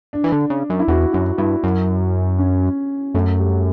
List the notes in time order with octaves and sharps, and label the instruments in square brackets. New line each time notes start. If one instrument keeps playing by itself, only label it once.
[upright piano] D4
[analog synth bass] E3
D3
C#3
F#2
[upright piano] E4
[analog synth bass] E2 [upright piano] F#4
[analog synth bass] F#2 [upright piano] F#4
[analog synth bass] G2 [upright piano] E4
[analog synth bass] F#2
[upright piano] C#4
[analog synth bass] F#2 [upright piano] A3
[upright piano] G3